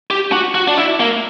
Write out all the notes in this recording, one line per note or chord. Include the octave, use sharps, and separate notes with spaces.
G4
F#4
F#4
D4
E4
A#3